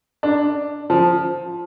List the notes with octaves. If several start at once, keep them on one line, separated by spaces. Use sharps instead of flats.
D4
F3